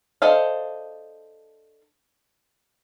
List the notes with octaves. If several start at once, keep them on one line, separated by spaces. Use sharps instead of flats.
D4 A4 C5 D#5 F5